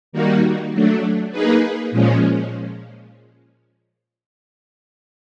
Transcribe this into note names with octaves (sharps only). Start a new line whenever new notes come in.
D#3 G3 A#3 D#4 F#4
F#3 A3 D4
A#3 D#4 G#4 B4
A#2 F3 G#3 C#4